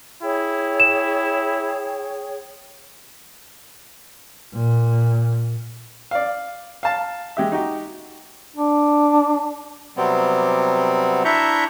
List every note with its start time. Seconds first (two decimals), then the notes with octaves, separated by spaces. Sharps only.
0.22 E4 G#4 C#5 G5
0.80 E7
4.54 A#2
6.11 D5 F5
6.83 F5 A5
7.37 G#3 G4 E5
7.52 D#4 F#4 G4
8.56 D4
9.97 C3 F#3 G3 B3 C4
11.25 D4 E4 E5 A#5 C#6 G6